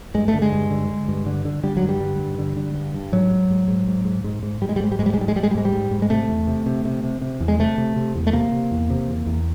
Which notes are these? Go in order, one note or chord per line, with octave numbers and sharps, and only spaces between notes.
G2 G#3
A3
D3
G#3
G2
D3
D3
G2
D3
D3
D3 G3
F#3
G2
G3
D3
G2
D3
D3
G2
G2
G#2 F#3
G#2
G#2
G#2
G#2
G#2
G#2
G#2
G#2 G3
G#3
G3
G#2 G#3
G3
G#2 G#3
G3
G#3
G#2 G3
G#3
G#2 G3
G#3
G3
G#2 G#3
G3
G#2
G#2
G#3
C3 A3
E2
C3
C3
C3
C3
C3
E2
G#3
C3 A3
C3
C3
E2
A3
C3 A#3
C3
E2
C3
E2
E2